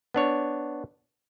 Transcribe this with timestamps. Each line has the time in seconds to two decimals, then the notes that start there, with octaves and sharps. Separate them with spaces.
0.14 B3 D4 C#5